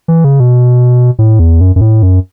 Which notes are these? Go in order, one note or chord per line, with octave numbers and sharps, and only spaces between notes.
E3
C#3
B2
A2
E2
F#2
F#2
A2
F#2